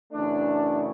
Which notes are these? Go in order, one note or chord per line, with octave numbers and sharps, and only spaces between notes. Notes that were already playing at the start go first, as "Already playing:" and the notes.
F#2 C#3 E3 A3 D4